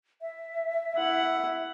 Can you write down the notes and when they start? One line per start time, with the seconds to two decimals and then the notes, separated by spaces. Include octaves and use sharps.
0.22 E5
0.96 E4 F#5